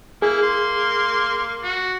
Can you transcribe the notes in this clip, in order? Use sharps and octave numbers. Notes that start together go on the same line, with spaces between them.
A#3 E4 G#4
C6
F#4